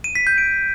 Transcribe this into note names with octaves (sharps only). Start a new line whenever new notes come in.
D#7
B6
G6
D7